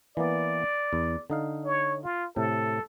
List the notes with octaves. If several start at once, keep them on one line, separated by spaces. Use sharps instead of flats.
E3 A#3 B3 D5
E2
D3 D#4 F5
C#5
F4
A2 C3 A4